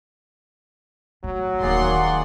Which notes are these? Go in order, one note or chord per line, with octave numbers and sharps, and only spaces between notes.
A2 F#3
D#1 D#2 A#3 G#4 D5 F#5 C6